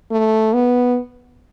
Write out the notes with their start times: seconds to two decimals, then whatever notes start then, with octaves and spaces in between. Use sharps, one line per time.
0.11 A3
0.54 B3